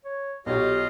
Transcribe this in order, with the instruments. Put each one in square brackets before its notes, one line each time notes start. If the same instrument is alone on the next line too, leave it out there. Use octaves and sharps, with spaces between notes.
[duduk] C#5
[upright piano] B1 C#5 [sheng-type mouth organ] F4 D#5 F5 [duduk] G4